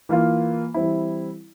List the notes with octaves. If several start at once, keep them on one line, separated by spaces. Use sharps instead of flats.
E3 A#3 F4
E3 G3 C4 E4